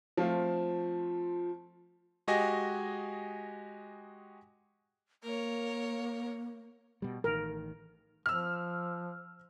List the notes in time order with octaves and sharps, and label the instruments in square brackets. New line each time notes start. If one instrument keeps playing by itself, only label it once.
[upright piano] F3 A3 C4 F4
[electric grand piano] G#3 F#4 G4 D#5 G#5 A#6
[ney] A#3 [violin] A#4 C#5
[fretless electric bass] B2 G3
[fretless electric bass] A1 D#3 [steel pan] A#4
[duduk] F3 [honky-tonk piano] E6 F6